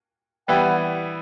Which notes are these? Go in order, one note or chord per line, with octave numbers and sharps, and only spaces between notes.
E3 G3 B3 E4 G5
F#5